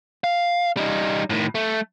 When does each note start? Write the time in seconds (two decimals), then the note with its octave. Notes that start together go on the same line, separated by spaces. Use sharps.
0.24 F5
0.77 G3 D#4
1.30 A2 D#3
1.55 A3